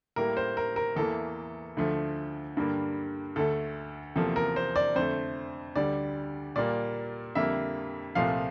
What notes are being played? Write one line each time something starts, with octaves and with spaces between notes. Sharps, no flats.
A2 G3 A#3 A#4
C5
A#4
A#4
E2 E3 A#3 A4
D2 D3 F3 A3
G2 D3 G3 A#3
D2 D3 A3 A4
E2 C3 F3 A#3 A4
A#4
C5
D5
F2 D3 A3 C5
D2 D3 G3 D5
A#2 G3 A#3 D5
F2 D3 G3 A#3 E5
C2 A#2 F3 A3 F5